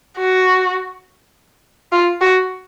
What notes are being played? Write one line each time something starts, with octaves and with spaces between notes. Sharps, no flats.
F#4
F4
F#4